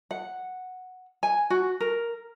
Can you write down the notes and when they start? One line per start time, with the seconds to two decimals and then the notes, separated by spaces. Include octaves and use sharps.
0.11 F#5
1.23 G#5
1.50 F#4
1.80 A#4